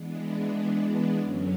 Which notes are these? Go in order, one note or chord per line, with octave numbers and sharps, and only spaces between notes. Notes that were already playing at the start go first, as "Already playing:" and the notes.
Already playing: E3 G#3 B3 D4
F#2 D3 F#3 C#4